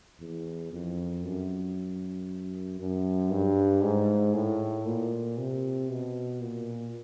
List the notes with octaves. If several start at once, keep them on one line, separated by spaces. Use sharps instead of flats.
E2
F2
F#2
F#2
G2
G#2
A2
A#2
C3
B2
A#2